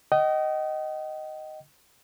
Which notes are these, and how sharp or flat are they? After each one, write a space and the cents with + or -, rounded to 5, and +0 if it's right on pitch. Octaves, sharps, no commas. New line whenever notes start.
D#5 +0 G5 -45